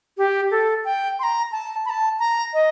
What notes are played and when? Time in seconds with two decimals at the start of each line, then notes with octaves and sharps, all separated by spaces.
0.18 G4
0.51 A4
0.85 G5
1.19 C6
1.23 A#5
1.52 A5
1.86 B5
1.90 A5
2.19 A#5
2.54 D#5